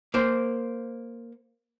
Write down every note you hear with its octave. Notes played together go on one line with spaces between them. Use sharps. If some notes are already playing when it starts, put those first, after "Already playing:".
A#3 C5